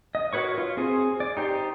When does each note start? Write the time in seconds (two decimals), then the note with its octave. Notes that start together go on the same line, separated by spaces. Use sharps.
0.15 D#5
0.33 F#4 A#4 B4 C#5 C#6
0.58 F4
0.77 C4 G#4 C5
1.20 D5
1.37 D#4 G4 C5